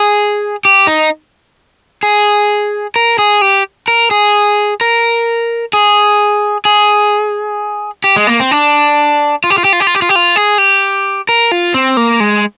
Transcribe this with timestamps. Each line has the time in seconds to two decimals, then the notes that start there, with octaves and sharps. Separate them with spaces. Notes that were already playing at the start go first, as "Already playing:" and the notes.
Already playing: G#4
0.65 G4
0.87 D#4
2.03 G#4
2.96 A#4
3.19 G#4
3.41 G4
3.88 A#4
4.11 G#4
4.81 A#4
5.73 G#4
6.65 G#4
8.04 G4
8.16 G#3
8.27 A#3
8.40 C4
8.51 D4
9.44 F4
9.50 G4
9.58 F4
9.65 G4
9.73 F4
9.80 G4
9.87 F4
9.95 G4
10.02 F4
10.09 G4
10.16 F4
10.36 G#4
10.58 G4
11.29 A#4
11.51 F4
11.74 C4
11.97 A#3
12.20 G#3